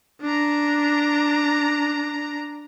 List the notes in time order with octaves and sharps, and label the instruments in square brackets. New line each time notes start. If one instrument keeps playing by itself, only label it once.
[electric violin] D4 A#5